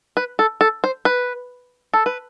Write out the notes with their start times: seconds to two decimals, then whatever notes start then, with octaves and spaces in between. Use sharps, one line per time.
0.17 B4
0.39 A4
0.61 A4
0.84 C5
1.05 B4
1.93 A4
2.06 B4